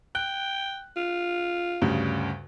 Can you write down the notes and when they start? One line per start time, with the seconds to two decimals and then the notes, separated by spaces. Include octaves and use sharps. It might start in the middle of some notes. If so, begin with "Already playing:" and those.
0.15 G5 F#6
0.96 F4
1.82 D2 G2 C#3